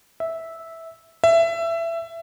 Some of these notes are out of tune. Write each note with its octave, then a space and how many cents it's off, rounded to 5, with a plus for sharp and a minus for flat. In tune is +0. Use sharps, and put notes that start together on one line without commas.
E5 -10
E5 +20